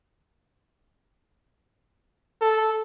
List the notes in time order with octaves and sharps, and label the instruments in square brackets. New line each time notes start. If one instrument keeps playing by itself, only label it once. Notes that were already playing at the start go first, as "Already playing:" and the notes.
[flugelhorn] A4